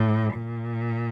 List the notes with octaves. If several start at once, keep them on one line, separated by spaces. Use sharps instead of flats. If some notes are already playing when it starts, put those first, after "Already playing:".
Already playing: A2
A#2